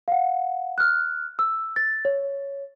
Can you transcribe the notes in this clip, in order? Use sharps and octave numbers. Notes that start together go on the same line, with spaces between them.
F5 F#5
F6 F#6
E6
A6
C#5